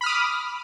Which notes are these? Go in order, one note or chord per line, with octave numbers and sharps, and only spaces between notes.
B5 D6 D#6 F6